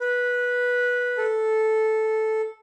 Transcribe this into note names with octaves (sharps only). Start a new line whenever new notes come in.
B4
A4